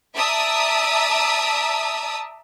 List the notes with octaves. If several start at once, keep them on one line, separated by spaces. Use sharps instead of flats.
D5 E5 A5 A#5 D#6 E6